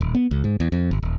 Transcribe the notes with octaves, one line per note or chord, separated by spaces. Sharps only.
D#1
B3
C#2
G#2
E2
F2
G1
D#1